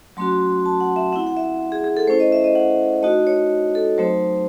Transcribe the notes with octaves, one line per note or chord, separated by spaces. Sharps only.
F#3 A3 C#4 F#4 C6
A5
F#5
E5
C4 E4 F#5
F#5
E5
G#4
G#4
A4
A3 C#4 E4 C5
D#5
E5
D#5
F#5
A3 D#4 F#4 D#5
C#5
A4
F#3 A3 C4 D#4 C5